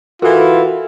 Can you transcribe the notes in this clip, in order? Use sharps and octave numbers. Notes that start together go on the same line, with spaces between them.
E3 F4 F#4 A4 A#4